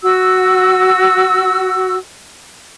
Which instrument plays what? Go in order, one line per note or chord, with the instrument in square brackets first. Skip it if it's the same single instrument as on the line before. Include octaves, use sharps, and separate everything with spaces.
[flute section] F#4 E6